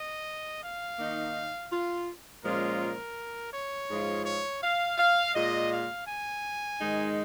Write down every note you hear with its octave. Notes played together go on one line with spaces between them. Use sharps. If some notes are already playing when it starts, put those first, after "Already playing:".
Already playing: D#5
F5
D#3 A#3 D#4
F4
A#2 F3 G#3 C#4 F4 A#4
A#4
C#5
G#2 F3 G#3 F4
C#5
F5
F5
A#2 G#3 F4 D#5
F5
G#5
G#2 D#3 G#3 D#4